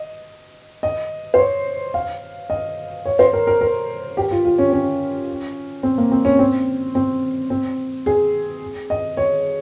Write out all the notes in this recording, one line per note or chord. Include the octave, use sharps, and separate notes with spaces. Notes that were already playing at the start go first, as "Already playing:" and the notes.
Already playing: D#5
D#5
C5
C#5
F5
D#5
C#5
C5
A#4
A#4
A#4
G4
F4
F4
C#4
C#4
C4
A#3
C4
C#4
C4
C4
C4
G#4
D#5
C#5